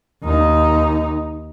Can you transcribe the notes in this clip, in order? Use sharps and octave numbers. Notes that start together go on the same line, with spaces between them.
D#2 D#4